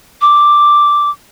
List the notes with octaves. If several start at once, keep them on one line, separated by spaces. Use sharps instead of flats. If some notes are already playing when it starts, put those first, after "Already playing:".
D6